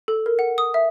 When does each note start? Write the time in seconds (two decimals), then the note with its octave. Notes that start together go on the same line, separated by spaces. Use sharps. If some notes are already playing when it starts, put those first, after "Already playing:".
0.08 A4
0.26 A#4
0.39 F#5
0.58 D#6
0.74 E5